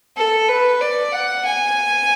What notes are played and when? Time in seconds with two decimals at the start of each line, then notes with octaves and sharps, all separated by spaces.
0.17 A4
0.48 B4
0.81 D5
1.13 F#5
1.45 G#5